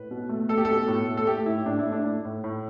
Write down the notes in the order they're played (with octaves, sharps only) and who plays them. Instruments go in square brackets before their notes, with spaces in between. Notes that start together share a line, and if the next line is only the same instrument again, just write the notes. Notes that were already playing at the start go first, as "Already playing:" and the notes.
Already playing: [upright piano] A2 B4
B2
A3
A3 A4
G4
B2 A4
A2
A3
A4
A3 G4
A2 E4
A2 D4
E4
A3
D4
A3 E4
A2
A2